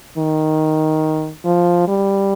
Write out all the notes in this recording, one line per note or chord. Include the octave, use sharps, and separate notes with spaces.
D#3
F3
G3